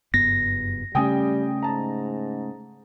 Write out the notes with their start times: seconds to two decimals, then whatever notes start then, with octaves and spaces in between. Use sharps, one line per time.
0.14 F#1 G2 B3 A#6
0.95 C#3 G3 A3 C#4 G5 G#5 D#6
1.63 G#2 A5 A#5